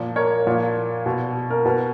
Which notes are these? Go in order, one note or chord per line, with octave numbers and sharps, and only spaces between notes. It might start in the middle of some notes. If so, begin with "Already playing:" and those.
Already playing: A#2 F3
A#4 C#5
A#2 F3
B2
A#4
B2 B4